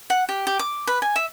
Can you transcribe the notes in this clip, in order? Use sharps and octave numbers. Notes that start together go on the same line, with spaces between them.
F#5
G4
G4
D6
B4
G#5
E5